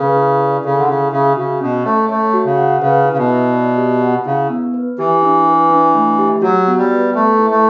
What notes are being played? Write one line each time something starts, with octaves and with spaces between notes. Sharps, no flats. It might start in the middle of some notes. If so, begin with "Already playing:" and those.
Already playing: C#3 B4
E4
D5
C#3 A4
D3
C#3 E4
C#3 E5
C#3 F#4
B2 C#4
A3 C#5
A3 C#5
F#4
C#3
F#5
C#3 B4
E4
C#3
B2
E5
D5
G4
F#5
C#3 E4
B3
B4
E3 G4
D4
B4
D4
A3
G4
F#3 F#4
B3
G3
B4
A3 A4
E4
A3